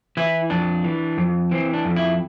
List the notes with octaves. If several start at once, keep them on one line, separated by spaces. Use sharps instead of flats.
E3 E4
F2 D4
E3
F2
E3 C4
D4
F2
E4